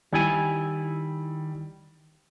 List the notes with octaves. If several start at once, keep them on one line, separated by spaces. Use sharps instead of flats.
D#3 G3 E4 G#5